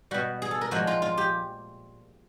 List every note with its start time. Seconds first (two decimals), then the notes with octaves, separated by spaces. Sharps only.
0.11 G3 F#4
0.14 B2
0.42 G#4
0.51 A4
0.61 A#4
0.71 A#2 F3 G#3 F#4
0.87 F4
1.02 F4
1.17 G4